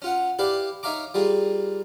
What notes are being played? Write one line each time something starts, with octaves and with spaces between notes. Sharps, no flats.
C#4 F4 F#5
E4 G4 B4 D5 F5
D#4 C#5 E5 F5 A#5 D6
G3 A#3 F4 G#4